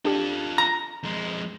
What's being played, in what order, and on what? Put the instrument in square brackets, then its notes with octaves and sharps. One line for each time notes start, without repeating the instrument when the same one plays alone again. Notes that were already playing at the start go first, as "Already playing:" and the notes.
[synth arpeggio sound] D4 G4 [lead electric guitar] F4 A4
[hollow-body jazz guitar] A#5
[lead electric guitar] F2 G#3